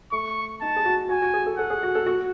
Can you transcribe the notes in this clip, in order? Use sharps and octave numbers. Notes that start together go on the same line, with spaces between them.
A3 C#6
D#4 A5
G#4
F#4
F#4 G#5
F#4
G#4
A4
A4 F#5
G#4
F#4
A4
F#4